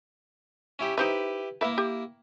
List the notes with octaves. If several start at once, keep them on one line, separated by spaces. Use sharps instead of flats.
C#4 E4 G4
D#4 E4 G4 B4 C5 E5
A#3 E4 B4 E5
G4